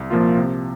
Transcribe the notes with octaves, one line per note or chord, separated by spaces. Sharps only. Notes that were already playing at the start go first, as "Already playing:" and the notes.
Already playing: C2
A#2 F3 A#3 F4
C3